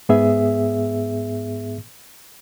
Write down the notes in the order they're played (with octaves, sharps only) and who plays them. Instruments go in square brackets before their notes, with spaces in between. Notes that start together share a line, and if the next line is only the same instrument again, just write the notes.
[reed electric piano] G#2 B3 G#4 E5